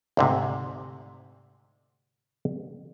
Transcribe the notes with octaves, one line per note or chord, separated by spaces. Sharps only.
D2 G#2 C3